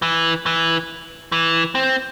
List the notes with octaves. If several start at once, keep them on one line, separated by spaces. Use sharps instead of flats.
E3
E3
E3
C4